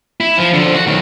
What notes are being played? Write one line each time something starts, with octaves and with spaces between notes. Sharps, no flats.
E4
F3
D3 F3
F#4
B1 D#3